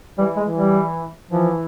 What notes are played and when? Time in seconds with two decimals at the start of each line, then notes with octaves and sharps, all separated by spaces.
0.18 E3 G3
0.36 G#3
0.47 E3
0.56 G3
1.31 E3 F3